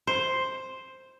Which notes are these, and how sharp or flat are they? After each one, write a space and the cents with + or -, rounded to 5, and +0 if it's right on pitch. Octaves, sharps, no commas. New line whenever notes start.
C5 +5